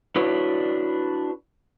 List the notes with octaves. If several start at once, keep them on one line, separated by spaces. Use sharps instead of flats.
D4 E4 F#4 B4 C#5 D5